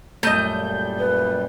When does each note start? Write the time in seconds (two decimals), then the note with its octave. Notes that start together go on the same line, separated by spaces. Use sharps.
0.23 F#2 A#2 G3 A3 D#5 G6
0.99 B4